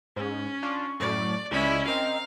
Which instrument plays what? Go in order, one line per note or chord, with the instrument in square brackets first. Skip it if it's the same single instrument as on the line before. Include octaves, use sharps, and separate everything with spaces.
[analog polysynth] G#2 [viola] C#4
[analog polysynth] D4 F4 [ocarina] C#6
[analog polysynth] F#2 A2 [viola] D5
[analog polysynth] C#2 G#3 B5 [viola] C#4 E4 [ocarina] D5
[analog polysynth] C4 A#4 [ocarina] D#5 [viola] F5